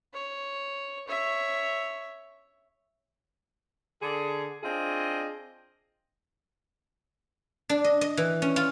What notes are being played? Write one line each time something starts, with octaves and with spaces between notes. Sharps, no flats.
C#5
C#5 E5
D3 G#4
C4 D4 F4 G#4 D#5
D4
D#5
D#5
E3
C#4
F4